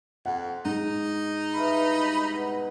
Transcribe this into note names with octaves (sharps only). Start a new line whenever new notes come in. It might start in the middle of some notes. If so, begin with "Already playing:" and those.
F2 F#5
G#2 D#4
G2 E3 F4 B5
B2